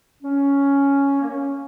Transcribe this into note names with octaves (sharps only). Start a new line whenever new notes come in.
C#4
A#3
C#4